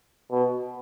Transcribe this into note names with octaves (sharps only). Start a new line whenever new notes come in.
B2